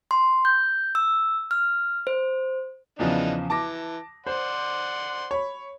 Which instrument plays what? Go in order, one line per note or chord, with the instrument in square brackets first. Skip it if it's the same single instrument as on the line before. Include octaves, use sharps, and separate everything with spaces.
[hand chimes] C6
G6
E6
F6
C5
[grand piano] E2 C#3 F3 [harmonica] E3 D4 D#4
[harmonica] E3 [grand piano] A5 D6 A#6
[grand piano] C5 [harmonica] D5 F#5 C6
[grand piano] C#5 B5